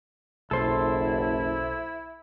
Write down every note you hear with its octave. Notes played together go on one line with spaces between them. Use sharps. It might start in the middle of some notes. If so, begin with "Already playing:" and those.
F#1 B1 E4 A4 C5 C6